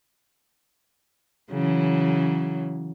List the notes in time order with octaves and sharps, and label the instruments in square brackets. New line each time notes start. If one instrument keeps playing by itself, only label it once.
[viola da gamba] C#3 E3 F#3